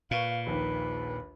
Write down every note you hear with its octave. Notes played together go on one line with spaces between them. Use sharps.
A#2 B4 F5 C#6
A#1 D#2 D#3 B4